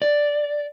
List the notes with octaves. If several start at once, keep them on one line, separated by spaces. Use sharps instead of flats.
D5